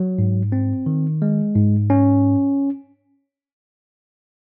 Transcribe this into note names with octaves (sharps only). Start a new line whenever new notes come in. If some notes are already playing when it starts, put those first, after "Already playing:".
Already playing: F#3
G#2
C4
D#3
G#3
G#2
C#4